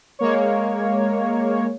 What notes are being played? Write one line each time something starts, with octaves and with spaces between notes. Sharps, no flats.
G#3 A#3 C#5